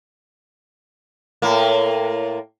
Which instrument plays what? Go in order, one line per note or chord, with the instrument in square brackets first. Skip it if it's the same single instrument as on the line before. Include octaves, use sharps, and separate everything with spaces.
[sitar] A2 A#3